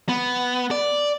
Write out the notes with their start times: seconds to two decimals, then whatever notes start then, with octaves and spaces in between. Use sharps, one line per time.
0.09 B3
0.71 D5